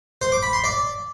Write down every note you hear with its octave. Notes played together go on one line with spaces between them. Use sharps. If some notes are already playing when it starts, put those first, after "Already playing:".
C5
D6
B5
C6
D5